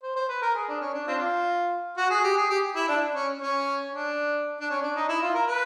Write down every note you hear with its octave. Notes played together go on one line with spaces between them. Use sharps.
C5
C5
B4
A#4
G#4
D4
C#4
D4
C4 D4 F4
F#4
G#4
G4
G#4
G4
E4
D4
C#4
C#4
D4
D4
C#4
D4
D#4
E4
F4
A#4
B4